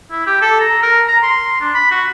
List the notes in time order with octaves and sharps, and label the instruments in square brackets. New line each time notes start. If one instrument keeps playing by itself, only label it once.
[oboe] E4
G4
A4
A#5
A#4
A#5
C6
D4
B5
F#4